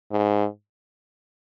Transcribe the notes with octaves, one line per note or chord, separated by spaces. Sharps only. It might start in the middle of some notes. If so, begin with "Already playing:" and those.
G#2